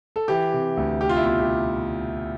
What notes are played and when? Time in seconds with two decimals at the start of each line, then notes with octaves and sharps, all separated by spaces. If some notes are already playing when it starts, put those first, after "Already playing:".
0.16 A4
0.28 E3 G4
0.53 C3
0.77 D2
1.01 C2 G4
1.09 F4
1.17 E4
1.25 B2 F4
1.38 G4